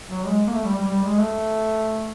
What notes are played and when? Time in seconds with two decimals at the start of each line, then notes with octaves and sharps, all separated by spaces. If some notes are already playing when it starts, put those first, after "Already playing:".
0.10 F#3
0.25 G#3
0.47 A#3
0.52 A3
0.64 G3
0.76 G3
0.88 G3
1.04 G#3
1.19 A3